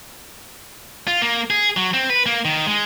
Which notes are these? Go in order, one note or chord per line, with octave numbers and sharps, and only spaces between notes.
F4
A#3
G#4
F#3
C4
B4
A#3
D#3
G#3